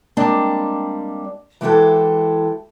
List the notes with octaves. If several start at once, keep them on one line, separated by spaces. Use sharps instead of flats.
G3 G#3 A#3 C4 D4
E3 G#3 E4 F#4 G4 A4